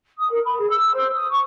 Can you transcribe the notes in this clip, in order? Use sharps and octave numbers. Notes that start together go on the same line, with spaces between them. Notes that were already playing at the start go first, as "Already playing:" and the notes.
D#6
A#4
B5
G#4
E6
C5
D#6
C#6